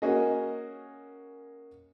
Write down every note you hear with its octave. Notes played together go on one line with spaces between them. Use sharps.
A#3 C#4 F#4 G#4 D#5